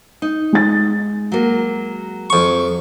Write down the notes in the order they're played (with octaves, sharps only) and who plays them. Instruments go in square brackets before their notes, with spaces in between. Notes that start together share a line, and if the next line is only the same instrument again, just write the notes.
[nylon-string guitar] D#4
[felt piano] G#3 A6
[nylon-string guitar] F#3 A#3
[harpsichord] F2 C#6